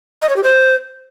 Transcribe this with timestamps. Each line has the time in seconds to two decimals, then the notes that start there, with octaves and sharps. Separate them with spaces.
0.22 D#5
0.29 C#5
0.36 G4
0.43 C5